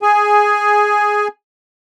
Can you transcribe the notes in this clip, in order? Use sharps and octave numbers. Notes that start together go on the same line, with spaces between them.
G#4 G#5